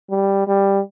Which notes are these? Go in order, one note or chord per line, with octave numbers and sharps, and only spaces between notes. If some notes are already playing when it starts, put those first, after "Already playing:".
G3
G3